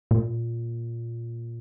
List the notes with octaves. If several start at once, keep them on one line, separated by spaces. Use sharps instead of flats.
A#2